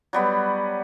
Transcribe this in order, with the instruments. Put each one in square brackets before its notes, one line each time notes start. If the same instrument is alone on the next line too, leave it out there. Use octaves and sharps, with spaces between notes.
[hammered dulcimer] F#3 G3 B3